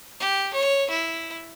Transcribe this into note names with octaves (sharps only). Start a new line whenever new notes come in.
G4
C#5
E4